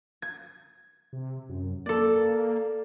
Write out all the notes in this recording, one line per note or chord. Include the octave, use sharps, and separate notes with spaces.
G#6
C3
F#2
A#3 A4 D5